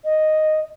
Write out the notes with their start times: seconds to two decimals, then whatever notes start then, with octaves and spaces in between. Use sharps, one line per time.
0.05 D#5